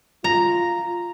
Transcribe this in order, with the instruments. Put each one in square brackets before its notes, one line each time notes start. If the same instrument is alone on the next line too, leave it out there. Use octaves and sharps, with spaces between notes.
[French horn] F4 [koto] A#5